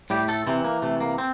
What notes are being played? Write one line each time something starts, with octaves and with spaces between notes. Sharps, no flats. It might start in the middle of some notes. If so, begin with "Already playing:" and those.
A2 G3 G4
A3 A4
C3 E3 C4
A#3
C3 A3
A#3
C4